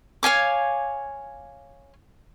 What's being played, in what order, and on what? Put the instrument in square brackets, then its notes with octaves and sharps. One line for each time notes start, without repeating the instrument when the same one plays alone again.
[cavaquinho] C#5 F5 G#5 D6